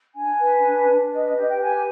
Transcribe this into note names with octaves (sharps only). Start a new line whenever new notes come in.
D4 G#5
B4
D4
D4
B4 D#5
D#5
G4 D#5
G5
B4 G#5